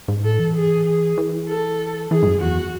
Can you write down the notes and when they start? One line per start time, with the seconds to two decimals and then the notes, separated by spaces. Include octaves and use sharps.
0.08 G#2
0.24 A2 A4
0.39 E3
0.55 G#4
0.86 G#4
1.18 E3
1.48 A4
2.11 E3 G#4
2.23 G#2
2.27 F#2
2.41 E2 F#4